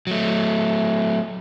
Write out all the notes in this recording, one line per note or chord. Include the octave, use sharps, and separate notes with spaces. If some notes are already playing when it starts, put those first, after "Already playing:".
F#3 A3